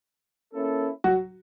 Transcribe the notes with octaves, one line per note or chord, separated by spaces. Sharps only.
A#3 C#4 E4 A4
F#3 F#4